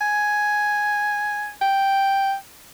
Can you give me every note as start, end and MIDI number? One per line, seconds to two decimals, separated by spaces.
0.01 1.50 80
1.61 2.34 79